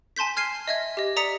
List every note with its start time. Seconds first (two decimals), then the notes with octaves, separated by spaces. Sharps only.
0.16 G#5 A5 C6 G6 B6
0.37 F6 G#6 C7 D#7
0.68 D#5 E5 G#6
0.97 G4 D#5
1.16 D5 A#5 D#6 B6 C#7